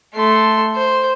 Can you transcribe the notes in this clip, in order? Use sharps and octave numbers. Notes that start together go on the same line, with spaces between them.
A3 C6
C5